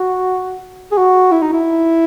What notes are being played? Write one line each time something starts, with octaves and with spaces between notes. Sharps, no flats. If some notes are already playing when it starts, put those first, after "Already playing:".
Already playing: F#4
G#4
F#4
E4
D#4
E4